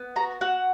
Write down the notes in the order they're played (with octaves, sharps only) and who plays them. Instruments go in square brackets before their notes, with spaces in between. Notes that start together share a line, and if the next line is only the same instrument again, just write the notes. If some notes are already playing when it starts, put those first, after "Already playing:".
Already playing: [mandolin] B3
F#4 A#5
F#4 F#5